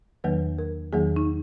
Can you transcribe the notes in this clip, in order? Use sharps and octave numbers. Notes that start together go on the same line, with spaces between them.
E2 D#3 F#3 A#3 B4
A#4
E2 D#3 F#3 A#3 G#4
D#4